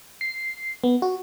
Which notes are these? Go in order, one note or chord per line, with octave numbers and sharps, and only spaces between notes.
C7
B3
F#4